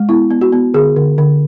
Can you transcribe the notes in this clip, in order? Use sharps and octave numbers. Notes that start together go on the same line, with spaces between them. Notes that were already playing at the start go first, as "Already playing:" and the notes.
Already playing: G#3
B3 E4
B3
F#4
B3
D3 G#4
D3
D3